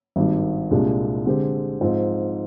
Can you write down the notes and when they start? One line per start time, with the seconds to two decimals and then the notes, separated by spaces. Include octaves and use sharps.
0.16 G#1 G2 D#3
0.71 C2 A#2 G#3 D4 G4
1.26 D3 G#3 C4 G4
1.81 G#2 F3 C4